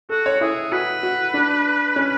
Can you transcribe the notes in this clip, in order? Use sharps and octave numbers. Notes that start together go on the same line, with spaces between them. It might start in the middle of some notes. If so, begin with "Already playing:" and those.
F#4 A4
C#5
E4 G#4
F#4 B4
F#4
D4
C#4